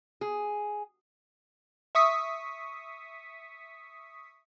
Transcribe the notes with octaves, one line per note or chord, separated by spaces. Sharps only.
G#4
E5 C#6 D#6 B6